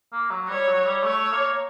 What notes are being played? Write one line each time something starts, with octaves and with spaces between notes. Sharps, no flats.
A#3
F#3
G3 C#5
F#3
G3
A3 C#5
A#3